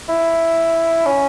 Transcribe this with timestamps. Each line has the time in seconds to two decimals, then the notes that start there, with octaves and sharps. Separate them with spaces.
0.09 E4
1.06 C#4